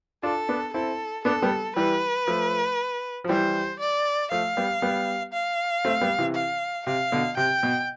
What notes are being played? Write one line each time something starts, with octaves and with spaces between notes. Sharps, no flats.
D4 F4 A4
B3 D4
C4 E4 A4
B3 D4 A4
G3 B3
E3 G3 B4
F3 A3
F3
E3 G3 C5
D5
F3 A3 F5
G3 B3
G3 B3
F5
A3 C4
G3 B3
C3 E3
F5
C3 F5
B2 D3
C3 G5
B2